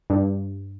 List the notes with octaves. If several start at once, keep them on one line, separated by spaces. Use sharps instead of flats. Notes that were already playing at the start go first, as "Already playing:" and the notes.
G2